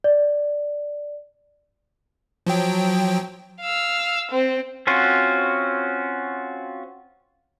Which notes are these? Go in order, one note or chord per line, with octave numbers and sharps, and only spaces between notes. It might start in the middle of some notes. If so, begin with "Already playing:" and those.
D5
F3 F#3 G5
F5 E6
C4
C4 C#4 F4 F#4